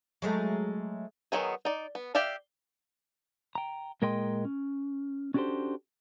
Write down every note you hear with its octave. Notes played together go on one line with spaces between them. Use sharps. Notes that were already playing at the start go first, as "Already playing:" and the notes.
F#3 G#3 A3
D#3 F3 F#3 B3 G#4
D#4 D5
B3
G4 D5 E5 F5
G5 A#5
A#2 G#3 A#4 D#5 G5 C6
C#4
C#4 D4 F#4 G4 A4 C5